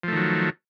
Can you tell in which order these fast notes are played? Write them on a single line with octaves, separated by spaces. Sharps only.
F3 A3 D#3 F#3